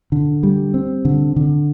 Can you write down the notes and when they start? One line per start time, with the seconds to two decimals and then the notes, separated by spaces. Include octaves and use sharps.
0.12 D3
0.43 G3
0.74 C4
1.05 D3
1.36 D3